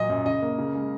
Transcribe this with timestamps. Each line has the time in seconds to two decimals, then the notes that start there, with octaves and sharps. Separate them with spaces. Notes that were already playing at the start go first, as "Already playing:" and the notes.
Already playing: A#2 F#3 D#5
0.10 F#2
0.26 C#3 D#5
0.42 A#3
0.58 C#3
0.75 G#3